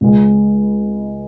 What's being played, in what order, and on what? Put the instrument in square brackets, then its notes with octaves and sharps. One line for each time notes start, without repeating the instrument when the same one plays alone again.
[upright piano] C#2 C#3 G#3